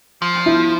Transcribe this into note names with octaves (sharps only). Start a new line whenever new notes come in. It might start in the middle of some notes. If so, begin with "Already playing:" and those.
F3
E4